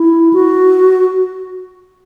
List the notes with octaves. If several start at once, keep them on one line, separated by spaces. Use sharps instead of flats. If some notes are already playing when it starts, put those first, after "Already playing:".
Already playing: E4
F#4